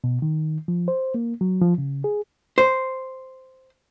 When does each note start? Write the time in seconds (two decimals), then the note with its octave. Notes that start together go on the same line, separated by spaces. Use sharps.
0.04 B2
0.22 D#3
0.68 F3
0.88 C5
1.14 A#3
1.41 F#3
1.62 F3
1.78 C#3
2.04 G#4
2.58 C5